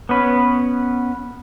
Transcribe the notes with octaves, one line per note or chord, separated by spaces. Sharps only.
B3 C#4 B4